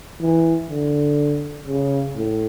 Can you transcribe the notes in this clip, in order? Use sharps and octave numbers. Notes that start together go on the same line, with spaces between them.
E3
D3
C#3
A2